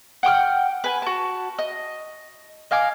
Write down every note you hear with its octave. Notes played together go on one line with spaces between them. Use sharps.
F#5 G5 D6 F6
B4 G#5
F#4 A5
D#5
D#5 F5 G#5 D6